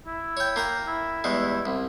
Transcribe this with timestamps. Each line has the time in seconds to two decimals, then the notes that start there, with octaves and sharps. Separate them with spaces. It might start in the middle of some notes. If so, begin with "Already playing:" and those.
0.06 E4
0.37 C#5 G5
0.56 A#3 A#4 G5
0.87 E4
1.24 E2 G3 G#3
1.66 C2